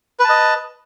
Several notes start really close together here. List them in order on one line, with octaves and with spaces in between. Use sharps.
B4 A5 D#5